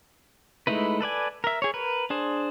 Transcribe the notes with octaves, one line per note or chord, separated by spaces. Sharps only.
G#3 A3 D#4 E4 B4
A4 B4 D5 G#5
A#4 E5
G#4 C#5
A#4 B4
D4 G#4 C5